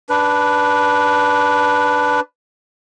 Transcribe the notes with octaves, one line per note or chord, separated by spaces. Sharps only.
D4 B4